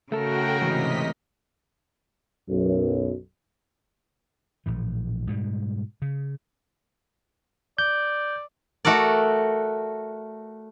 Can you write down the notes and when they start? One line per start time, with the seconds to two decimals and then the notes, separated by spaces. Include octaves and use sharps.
0.12 C#3 A3 F#4 A4 A#4 G5
0.61 G#2 C3 E3 A3 D#5 B6
2.49 B1 F#2
4.66 A#1 A2 E3
5.27 G#2 B2 G3
6.02 C#3
7.78 D5 G6
8.85 A3 F#4 A4 A#4 D5